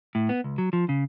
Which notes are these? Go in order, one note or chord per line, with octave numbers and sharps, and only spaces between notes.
A2
B3
C#2
F#3
F3
C#3